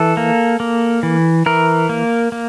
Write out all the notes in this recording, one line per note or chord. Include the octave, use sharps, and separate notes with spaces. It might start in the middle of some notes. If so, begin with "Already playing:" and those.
Already playing: E3 A4
A#3
A#3
E3
E3 A#4
A#3
A#3